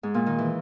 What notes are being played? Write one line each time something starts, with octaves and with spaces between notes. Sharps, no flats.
G#2
A#2
D#3
E3